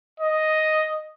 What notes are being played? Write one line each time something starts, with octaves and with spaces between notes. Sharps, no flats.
D#5